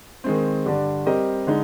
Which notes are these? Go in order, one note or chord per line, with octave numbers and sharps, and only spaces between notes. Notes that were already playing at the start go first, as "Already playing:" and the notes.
D#3 G#3 C4
G2 D3 G3 D4
G3 C4 G4 A#4 D#5
D3 G#3 D#4